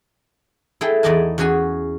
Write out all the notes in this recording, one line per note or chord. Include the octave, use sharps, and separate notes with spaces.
E4 G#4 A4 G5
E2 D#4 D5 D#5 G#5 A5
E2 C#4 F#4 G#4 G#5